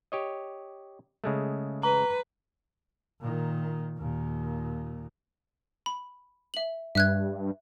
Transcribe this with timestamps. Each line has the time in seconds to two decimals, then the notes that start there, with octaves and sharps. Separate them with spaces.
0.12 G4 C#5 D#5
1.24 C#3 G#3 A3
1.83 B4 A#5
3.20 A#2 D#3
3.98 D#2 A#2
5.86 B5
6.54 E5 F#7
6.95 G2 E5 F#6 G#6